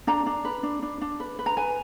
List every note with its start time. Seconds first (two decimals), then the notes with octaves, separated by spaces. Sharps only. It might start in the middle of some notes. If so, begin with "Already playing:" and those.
0.07 D4 A#5
0.26 D4
0.45 B4
0.63 D4
0.83 D4
1.01 D4
1.20 B4
1.39 B4
1.46 A#5
1.57 B4 G#5